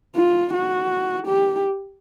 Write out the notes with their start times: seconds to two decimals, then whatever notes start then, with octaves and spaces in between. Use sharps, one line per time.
0.16 F4
0.53 F#4
1.27 G4